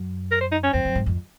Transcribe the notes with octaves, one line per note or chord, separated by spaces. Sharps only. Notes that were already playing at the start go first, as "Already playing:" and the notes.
Already playing: F#2
A#4
C5
D#4
C#4
F2 C4
F#2
G#2
F2